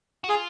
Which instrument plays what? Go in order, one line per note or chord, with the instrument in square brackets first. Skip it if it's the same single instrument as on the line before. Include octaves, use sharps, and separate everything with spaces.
[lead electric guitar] F#4
[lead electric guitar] F4 [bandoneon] G#4